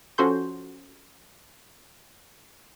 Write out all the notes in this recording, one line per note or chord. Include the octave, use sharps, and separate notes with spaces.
F3 C#4 F#4 A4 C6 G6